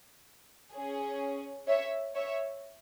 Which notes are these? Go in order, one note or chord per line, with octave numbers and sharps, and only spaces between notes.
C#4 G#4
C#5 E5
C#5 E5